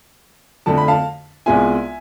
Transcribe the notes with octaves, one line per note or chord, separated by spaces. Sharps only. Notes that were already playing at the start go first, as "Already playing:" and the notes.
F2 D3 A3 A5
B5
F5 A5
C2 C3 G#3 B3 F4 E5 G#5